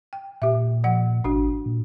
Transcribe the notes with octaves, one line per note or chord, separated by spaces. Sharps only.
G5
A#2 G4 E5
F3 F#5
G#1 D4 F#4
A#2